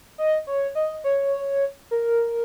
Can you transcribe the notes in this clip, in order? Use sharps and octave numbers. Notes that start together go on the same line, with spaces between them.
D#5
C#5
D#5
C#5
A#4